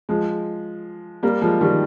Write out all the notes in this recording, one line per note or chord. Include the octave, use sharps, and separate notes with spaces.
F3 G#3
G3 A#3
F3 G#3
D#3 G3